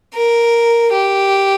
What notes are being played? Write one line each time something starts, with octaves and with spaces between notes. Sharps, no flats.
A#4
G4